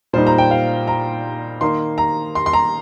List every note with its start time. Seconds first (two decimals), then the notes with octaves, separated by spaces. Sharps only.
0.13 A#2 G3 D#4 C5
0.27 A#5
0.38 G5
0.51 F5
0.87 A#5
1.61 D#3 A#3 D#4 C6
1.98 A#5
2.35 C6
2.46 C6
2.53 A#5